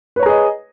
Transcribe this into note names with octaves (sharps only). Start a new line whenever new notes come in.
G#4 B4 C#5 D#5 A#5